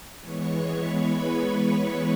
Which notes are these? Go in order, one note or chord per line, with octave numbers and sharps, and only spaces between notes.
E3 G#3 B3 C#5 C#6
B4 B5